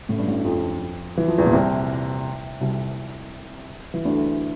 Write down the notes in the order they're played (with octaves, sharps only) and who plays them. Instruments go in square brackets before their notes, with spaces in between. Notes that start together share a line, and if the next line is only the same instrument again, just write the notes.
[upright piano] A1 A2
G2
A1 A2
F2 F3
E3
F3
E2 E3
A#2
C2 C3
C2 C3
E3
D2 D3